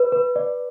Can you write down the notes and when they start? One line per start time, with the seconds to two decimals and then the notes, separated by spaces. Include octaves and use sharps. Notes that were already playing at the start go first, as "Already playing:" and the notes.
Already playing: B4
0.12 B4
0.36 D5